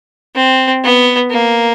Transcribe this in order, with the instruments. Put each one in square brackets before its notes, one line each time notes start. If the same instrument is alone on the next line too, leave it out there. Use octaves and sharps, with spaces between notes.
[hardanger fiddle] C4
B3
A#3